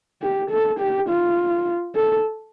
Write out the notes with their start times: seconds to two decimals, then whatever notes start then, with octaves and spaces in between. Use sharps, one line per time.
0.22 G4
0.51 A4
0.80 G4
1.09 F4
1.95 A4